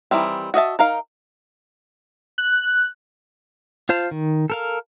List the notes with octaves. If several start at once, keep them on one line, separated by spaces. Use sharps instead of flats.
D#3 E3 G3 C4
F#4 D#5 E5 A5
D#4 A#4 F5
F#6
F4 C5 F5 A5
D#3
A4 A#4 F5